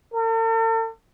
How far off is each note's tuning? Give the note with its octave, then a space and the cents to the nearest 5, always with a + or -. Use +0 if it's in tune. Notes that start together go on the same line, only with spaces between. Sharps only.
A4 +45